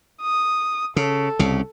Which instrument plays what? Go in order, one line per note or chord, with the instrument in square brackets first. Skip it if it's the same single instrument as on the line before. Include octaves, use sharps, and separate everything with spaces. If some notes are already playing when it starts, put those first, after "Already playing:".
[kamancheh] D#6
[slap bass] C#3 [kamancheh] A4
[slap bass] C2 C#3